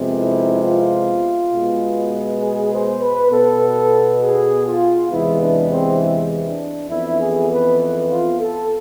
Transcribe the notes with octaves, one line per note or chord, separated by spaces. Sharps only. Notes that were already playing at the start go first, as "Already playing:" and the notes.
Already playing: F2 C3 G#3 B3
E4
F4
B2 G#3 B3
G#4
C5
B4
B2 B3 A4
G#4
F4
E2 C3 E3 G#3 B3 E4
D4
C4
D4
F2 E3 B3 E4
G#4
B4
F4
A4